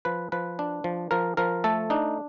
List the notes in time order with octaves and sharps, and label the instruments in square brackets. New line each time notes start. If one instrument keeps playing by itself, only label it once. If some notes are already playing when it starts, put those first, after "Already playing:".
[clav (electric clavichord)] F3 B4
F3 B4
D4
F3
F3 A#4
F3 A#4
A3 A4
D4 D#4